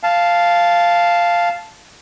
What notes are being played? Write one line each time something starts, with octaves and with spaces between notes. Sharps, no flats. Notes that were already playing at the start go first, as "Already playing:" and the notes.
F5 A5